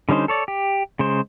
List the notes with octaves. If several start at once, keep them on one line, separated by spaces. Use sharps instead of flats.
D3 G3 C#4 D#4 C5
A4 C#5 D5
G4
C#3 G#3 C5